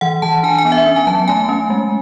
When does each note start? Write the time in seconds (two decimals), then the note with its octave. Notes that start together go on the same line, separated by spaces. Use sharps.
0.01 E3 F#5
0.22 E3 A5
0.43 D4 G#5
0.58 G#5
0.65 B3
0.72 E5
0.86 C#4
0.96 G#5
1.07 F#3 A5
1.28 A3 G#5
1.49 C#4
1.70 G#3